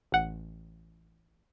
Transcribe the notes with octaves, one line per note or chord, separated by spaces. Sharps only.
A1 F#5